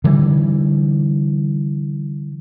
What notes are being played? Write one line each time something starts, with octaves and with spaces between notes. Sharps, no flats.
D3 E3 G3